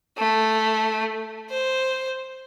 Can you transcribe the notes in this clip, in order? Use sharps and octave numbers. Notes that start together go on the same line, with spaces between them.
A3
C5